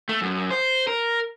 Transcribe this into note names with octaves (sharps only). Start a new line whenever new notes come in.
A3
F#2
C5
A#4